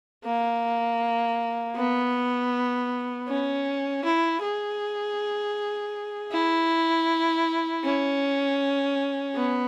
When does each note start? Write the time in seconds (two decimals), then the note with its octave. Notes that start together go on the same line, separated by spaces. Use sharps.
0.24 A#3
1.76 B3
3.28 C#4
4.04 E4
4.42 G#4
6.32 E4
7.84 C#4
9.35 B3